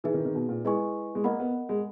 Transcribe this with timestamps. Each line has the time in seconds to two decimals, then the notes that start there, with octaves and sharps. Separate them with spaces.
0.04 E3 D#4 G#4 B4 E5
0.14 D#3
0.25 D#3
0.35 B2
0.49 A#2
0.65 G#3 E4 B4 D#5 G#5 C#6
1.15 G#3
1.24 A#3 A#4 D#5 F#5 B5
1.40 B3
1.69 G#3